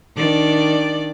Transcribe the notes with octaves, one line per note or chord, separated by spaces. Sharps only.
D#3 D4 D5